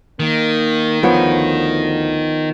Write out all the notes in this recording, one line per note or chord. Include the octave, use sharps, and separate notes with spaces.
D#3 A#3
D2 F3 B3 C#5